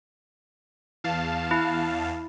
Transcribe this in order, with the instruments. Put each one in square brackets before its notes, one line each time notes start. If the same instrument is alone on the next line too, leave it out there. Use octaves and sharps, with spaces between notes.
[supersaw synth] E2 F5 A5
[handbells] E4